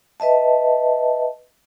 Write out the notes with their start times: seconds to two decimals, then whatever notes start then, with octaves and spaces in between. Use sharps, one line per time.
0.20 B4 D#5 E5 A5